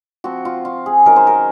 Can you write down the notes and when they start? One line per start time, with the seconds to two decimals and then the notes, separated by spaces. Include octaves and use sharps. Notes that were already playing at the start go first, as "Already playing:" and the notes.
0.24 F3 C4 F#4
0.45 F4
0.65 F4
0.86 G#4
1.06 D#3 F#3 C#4 A#4
1.16 C5
1.27 A#4